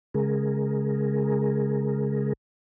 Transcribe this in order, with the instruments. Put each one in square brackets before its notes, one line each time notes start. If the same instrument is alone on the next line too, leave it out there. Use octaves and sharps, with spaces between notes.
[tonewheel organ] C#3 G#3 G#4 A#4